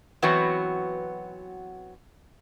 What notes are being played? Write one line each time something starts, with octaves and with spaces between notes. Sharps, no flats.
E3 F#3 B3 C4 F#4